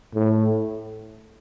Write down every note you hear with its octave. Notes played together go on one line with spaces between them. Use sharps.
A2